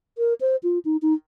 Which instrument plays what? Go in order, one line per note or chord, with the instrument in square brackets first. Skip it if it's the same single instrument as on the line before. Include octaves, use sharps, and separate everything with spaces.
[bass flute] A#4
C5
F4
D#4
D#4